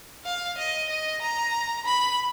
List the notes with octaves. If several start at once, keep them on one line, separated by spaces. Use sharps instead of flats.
F5
D#5
D#5
A#5
B5